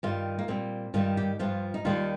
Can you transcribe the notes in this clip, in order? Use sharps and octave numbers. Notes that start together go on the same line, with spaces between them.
G2 D#3 G3 F4
A#3
A#2 G3 C4
G2 D#3 G3 F4
G4
G2 F3 F4
D#4
D#2 D#3 G3 F4